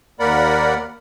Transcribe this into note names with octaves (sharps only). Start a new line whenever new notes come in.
D#2 A#3 A#4 D5 F#5 B5